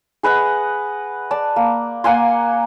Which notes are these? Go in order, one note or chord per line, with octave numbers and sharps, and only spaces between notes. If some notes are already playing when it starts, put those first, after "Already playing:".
G#4 B4 D#5 F#5
D5 A5
A#3
A#3 F#5 G#5 C6